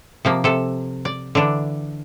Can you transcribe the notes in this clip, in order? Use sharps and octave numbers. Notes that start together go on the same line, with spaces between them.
C3 F3 A#3
C3 A4
D5
D3 E3 D4